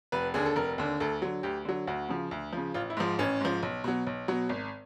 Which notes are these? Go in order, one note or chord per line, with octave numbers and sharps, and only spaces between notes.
F1 B4
D#2 D3 G#4
A4
F1 A#4
D#2 D3
D2 A4
D3 F#3
D2 G4
D3 F#3
D2 F#4
C#3 F3
D2
C#3 F3
A1 F4
E4
G#2 F3
A1 C#4
G#2 F3
B1
B2 F#3
B1
B2 F#3
G#1